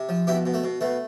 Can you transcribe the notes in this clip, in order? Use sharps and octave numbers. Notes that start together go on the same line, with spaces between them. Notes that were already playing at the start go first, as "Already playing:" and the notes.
Already playing: C3
F3
B2 E4 G4
B2
A3
B2
B2 A3